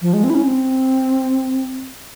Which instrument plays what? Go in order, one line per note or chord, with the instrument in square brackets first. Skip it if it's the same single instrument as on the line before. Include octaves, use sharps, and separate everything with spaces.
[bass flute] F3
G#3
C4
E4
C#4
C4